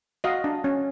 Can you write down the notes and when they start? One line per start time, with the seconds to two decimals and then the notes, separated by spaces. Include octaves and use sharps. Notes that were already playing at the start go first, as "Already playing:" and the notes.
0.24 F#4 D#5 F5
0.44 D4
0.64 C#4